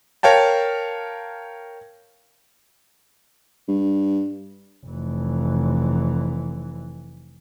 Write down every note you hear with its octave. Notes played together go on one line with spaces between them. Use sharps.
A#4 C#5 F5 G5 A5
G2
F1 E3